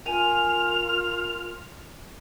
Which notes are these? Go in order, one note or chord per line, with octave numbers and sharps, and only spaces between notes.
F4 A#4 G#5 F7